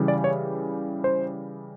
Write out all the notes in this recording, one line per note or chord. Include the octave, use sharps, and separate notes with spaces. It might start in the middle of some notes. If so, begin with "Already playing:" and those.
Already playing: C#3 E3 G3
D5
C#5
C5